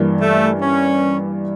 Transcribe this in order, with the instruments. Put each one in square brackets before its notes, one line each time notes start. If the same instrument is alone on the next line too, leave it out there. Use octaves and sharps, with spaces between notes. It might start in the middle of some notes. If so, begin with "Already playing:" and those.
Already playing: [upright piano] G2 E3 A#3
[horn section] A3
C#4